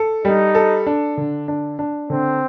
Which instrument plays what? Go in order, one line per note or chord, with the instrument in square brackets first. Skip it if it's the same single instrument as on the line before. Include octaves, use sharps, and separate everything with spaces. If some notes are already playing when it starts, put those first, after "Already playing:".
Already playing: [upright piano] A4
[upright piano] G3 [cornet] D#4
[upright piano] A4
D4
D3
D4
D4
[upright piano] D3 [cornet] C4